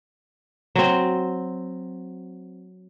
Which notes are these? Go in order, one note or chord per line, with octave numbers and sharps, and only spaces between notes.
F#3 C4